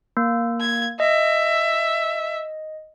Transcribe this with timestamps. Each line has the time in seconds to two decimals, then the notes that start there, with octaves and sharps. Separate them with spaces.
0.17 A#3
0.61 G#6
1.00 D#5 E5